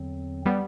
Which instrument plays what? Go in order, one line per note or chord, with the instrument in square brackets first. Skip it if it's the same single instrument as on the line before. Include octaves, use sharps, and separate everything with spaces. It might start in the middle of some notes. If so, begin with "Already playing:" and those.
Already playing: [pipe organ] E2 D3 F#3 C4
[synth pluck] G3 B3